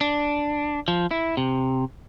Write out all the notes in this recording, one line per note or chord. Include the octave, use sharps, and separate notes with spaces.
D4
F3
E4
C3